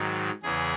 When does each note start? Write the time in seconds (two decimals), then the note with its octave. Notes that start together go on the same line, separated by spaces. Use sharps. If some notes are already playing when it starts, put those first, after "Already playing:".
Already playing: G#2 D#3 F#3
0.43 E2 C#3 E3 G#4